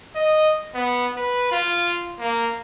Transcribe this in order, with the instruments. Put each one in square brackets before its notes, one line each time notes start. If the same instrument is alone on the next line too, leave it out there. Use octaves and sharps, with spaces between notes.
[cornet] D#5
B3
B4
F4
A#3